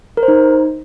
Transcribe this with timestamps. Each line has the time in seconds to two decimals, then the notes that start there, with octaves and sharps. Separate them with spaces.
0.17 A#4
0.23 C5
0.28 D#4